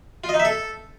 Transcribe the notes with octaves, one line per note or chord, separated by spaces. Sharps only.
F4
D#5
D#4
E5
A4